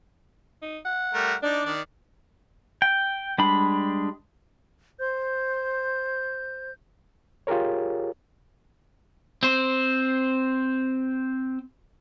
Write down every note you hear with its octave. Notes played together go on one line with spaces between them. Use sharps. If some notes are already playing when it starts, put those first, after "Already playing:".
D#4
F#5
G3 A3 A#4
D4 D#4 D5
D#3 D5
G5
G3 G#3 D4 B5
C5 G6
F4 G4 G#4 A#4 C#5
C4 C5